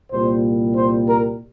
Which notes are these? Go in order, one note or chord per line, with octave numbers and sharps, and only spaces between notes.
C2 A#2 G3 C5
C5
A#4